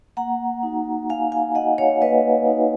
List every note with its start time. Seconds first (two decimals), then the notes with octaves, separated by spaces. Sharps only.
0.17 A#3 F#5 A#5
0.63 D#4 F#4
1.09 A#3 F5 G#5
1.32 F5 G#5
1.55 D#4 F#4 D#5 F#5
1.78 C#5 F5
2.01 A#3 B4 D#5
2.47 D#4 F#4